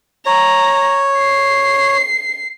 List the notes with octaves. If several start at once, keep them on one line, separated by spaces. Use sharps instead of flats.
C#5 A#5
C7